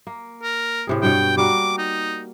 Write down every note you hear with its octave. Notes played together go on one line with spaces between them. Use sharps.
A#3
A#4
A2 C3 G#4
G2 B2 C#5 G5
G3 A#3 F#4 D6
D#4